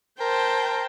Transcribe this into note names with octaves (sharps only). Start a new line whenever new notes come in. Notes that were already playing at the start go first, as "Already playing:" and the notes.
A#4 C5 G5 A5